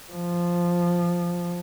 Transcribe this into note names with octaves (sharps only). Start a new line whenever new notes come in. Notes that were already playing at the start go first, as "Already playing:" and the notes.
F3